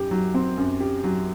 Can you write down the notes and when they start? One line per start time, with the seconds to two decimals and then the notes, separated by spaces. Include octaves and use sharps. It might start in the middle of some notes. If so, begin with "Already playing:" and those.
Already playing: F#2 G4
0.11 F#3
0.34 C4
0.58 F#2
0.80 G4
1.04 F#3